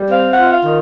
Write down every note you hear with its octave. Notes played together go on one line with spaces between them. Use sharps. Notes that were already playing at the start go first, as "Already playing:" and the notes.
Already playing: G3
C4 F5
F#5
F4
E5
F5
D#3